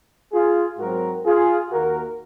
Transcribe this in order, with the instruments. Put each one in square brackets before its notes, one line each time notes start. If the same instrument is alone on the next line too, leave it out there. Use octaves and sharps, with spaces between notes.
[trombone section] F4 G#4
G#2 F#3 C4 F#4 A#4
F4 G#4
D#2 D#3 A#3 F#4 A#4